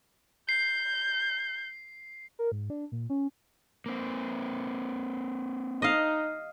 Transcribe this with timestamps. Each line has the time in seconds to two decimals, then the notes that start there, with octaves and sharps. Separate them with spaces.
0.49 G6 C7
2.39 A#4
2.52 G#2
2.70 D4
2.92 A#2
3.10 C#4
3.86 A#3 C4
5.82 D#4 D#5 F5